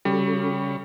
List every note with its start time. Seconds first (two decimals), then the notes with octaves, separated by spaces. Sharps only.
0.05 C#3 G3 C#4 F#4 A4